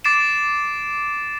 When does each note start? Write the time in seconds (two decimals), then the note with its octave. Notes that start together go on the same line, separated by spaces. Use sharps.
0.05 D6 A6 C7 D7 E7